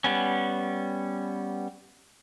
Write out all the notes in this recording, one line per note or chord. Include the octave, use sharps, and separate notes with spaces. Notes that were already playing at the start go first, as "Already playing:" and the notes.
G3 B3 C#4